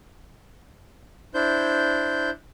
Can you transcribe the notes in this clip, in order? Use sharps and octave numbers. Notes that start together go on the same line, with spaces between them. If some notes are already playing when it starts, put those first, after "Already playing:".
D4 E4 C5 G6